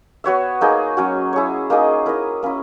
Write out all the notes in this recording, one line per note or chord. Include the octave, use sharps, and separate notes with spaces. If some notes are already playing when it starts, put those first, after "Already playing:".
B3 F#4 C#5 E5
A#3 D#4 G#4
F#3 C#4 F#4
E4 G#4 C#5
A#3 D#4 G#4 D#5
E4 A#4 D#5
A#3 C#4 E4